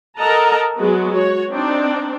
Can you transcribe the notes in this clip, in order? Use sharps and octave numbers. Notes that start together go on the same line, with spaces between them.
A4 A#4 D#5 F#5 A5 A#5
F#3 G#3 B3 F#4
F#4 C#5
C4 D4 D#4